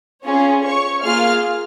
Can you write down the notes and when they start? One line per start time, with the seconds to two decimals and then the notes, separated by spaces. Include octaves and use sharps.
0.24 C#4 F4 G#4 C#5
0.63 C#5 C#6
1.03 A#3 F4 G#4 F5 F6